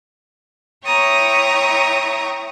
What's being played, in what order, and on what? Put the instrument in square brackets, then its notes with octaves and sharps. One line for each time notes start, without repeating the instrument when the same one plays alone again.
[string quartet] E4 C#5 G5 A#5 C#6 D#6